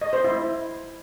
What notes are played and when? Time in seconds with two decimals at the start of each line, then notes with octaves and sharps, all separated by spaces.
0.02 D#5
0.13 C5
0.24 E4